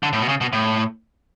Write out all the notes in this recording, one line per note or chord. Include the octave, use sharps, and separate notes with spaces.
D3
A2
B2
C#3
B2
A2